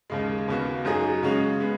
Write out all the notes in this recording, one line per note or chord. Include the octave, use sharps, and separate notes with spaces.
D#2 C#3 G#3
D#2 C#3 B3 F#4
F#2 F#3 D#4 G#4
C#3 G#3 C#4 F#4
G#3 B3